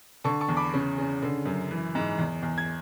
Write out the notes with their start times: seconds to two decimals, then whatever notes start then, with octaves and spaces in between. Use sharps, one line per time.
0.24 D3 A5 C#6
0.41 A5 C#6
0.49 E2
0.57 B5 D6
0.74 C#3
0.98 C#3
1.23 D3
1.46 F#2
1.71 E3
1.95 G#2
2.18 E2
2.43 E2
2.58 G#6